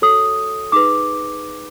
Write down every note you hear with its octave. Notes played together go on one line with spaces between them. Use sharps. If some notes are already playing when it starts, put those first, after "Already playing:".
F#4 A4 C#5 D#6
D#4 G#4 B4 D6